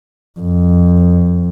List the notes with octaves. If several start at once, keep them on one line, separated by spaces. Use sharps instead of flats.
F2